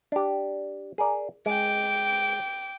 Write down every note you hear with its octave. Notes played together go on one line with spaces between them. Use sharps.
D4 G4
G#4 A#4 D5
G#3 G5 D6